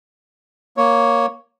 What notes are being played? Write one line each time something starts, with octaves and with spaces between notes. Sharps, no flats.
A#3 C#5